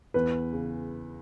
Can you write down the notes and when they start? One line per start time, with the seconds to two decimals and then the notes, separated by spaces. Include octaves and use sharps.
0.14 E2 B4
0.53 C#3